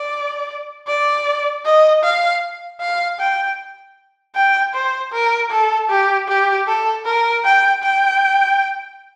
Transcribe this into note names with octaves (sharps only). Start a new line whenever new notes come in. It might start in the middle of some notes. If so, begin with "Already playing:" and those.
Already playing: D5
D5
D#5
F5
F5
G5
G5
C5
A#4
A4
G4
G4
A4
A#4
G5
G5